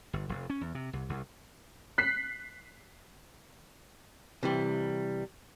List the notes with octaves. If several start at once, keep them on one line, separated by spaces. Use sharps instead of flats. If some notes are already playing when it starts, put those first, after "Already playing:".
G1
F1
C#4
E2
C3
C2
C2
F#6 B6 C7
C3 E3 G3